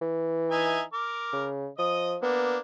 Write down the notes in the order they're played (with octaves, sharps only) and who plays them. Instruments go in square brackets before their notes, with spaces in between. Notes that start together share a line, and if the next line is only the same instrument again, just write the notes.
[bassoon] E3
[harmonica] D#4 E5 G#5
A#4 D6
[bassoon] C#3
[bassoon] F3 [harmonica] D#5 D#6
[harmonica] A#3 D4 [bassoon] B3